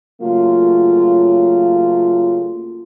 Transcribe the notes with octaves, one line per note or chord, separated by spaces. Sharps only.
C#3 F#3 A3 A#3 F4